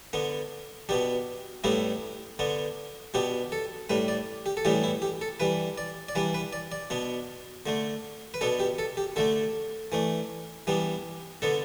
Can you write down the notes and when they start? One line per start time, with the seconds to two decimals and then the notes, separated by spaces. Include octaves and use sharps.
0.13 D3 B3 D4
0.89 B2 B3 D4 G4
1.64 A2 G3 B3 D4 E4
2.39 D3 B3 D4
3.14 B2 B3 D4 G4
3.52 A4
3.90 A2 G3 D4 B4
4.08 D5
4.46 G4
4.57 A4
4.65 A2 E3 G3 B3 D4 G4
4.84 E4
5.02 G4
5.21 A4
5.40 E3 G3 D4 B4
5.78 D5
6.09 D5
6.15 E3 G3 D4 B4
6.34 B4
6.53 D5
6.72 D5
6.90 B2 B3 D4
7.66 D3 A3 D4
8.34 B4
8.41 B2 B3 D4 A4
8.60 G4
8.79 A4
8.97 G4
9.16 D3 A3 D4 A4
9.92 E3 A3 D4
10.67 E3 G3 B3 D4
11.42 D3 B3 D4 A4